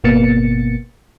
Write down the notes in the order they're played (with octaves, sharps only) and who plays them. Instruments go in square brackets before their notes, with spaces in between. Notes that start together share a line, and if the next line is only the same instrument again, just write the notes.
[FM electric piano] G1 B2 A#3 B3 A6 C#7